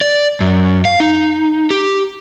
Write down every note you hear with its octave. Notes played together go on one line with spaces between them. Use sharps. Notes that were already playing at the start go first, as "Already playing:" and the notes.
D5
F#2
F5
D#4
G4